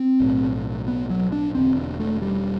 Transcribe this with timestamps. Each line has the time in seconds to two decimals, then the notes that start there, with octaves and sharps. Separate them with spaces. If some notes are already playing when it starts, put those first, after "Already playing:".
Already playing: C4
0.20 B1 A2
0.88 B3
1.10 F#3
1.32 D4
1.55 E1 E2 D3 C4
1.99 A3
2.22 G3